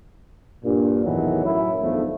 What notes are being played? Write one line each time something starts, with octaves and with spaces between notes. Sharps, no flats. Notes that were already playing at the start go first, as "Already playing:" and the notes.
G2 A#2
A1 E2 B2 D#3 E3 F#3
F#2 A2 E4
B1 E2 B2 D3 F3 A3